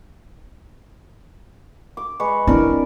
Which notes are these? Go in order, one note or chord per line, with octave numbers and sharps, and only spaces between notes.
D6
G#3 B4 C#6
C4 D4 E4 A#4